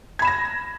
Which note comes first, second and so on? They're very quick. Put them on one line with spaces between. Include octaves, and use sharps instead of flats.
G#6 B5 E7 A#6